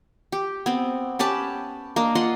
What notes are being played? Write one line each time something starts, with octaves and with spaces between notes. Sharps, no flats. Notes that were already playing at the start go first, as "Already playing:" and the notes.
G4
B3 C4
C#4 G4 B4 A5
A#3 D4 D#5
F4 D#5 F#5 C6